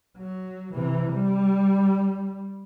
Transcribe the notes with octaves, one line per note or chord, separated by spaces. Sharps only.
F#3
C3 E3
G3